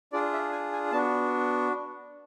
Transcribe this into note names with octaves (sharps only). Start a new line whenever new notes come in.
D4 F4 G#4 D5
E5
G#5
G#5
B3 D4 F#4 A5